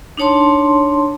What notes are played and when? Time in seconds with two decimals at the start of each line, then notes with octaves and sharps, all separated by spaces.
0.17 D4 D#4 C#5 A5 C6